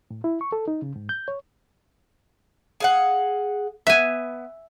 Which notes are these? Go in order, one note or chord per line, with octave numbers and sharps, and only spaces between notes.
A2
E4
C#6
A4
D#4
C#3
G#2
G6
C#5
G#4 F5 F#5
B3 E5 G#5